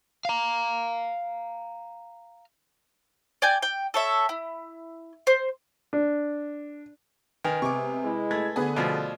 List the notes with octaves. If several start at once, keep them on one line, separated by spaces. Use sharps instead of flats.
F5 A#5
D5 G5 G#5 G6
G5
A4 C#5 E5
E4
C5
D4
D#3 B4 G#5
C3 G#3 B3 G#4 C#6 D6
G#3 E4
A3 G#6
D3 B3 G#4
B2 F3 A3 D5